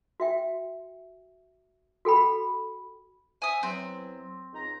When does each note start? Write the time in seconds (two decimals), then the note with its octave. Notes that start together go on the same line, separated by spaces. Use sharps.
0.20 F#4 E5 G5
2.05 F#4 A4 G5 B5
3.42 C5 E5 G#5 D#6
3.63 E2 F#3 C4
4.53 C#2 D#4 A#5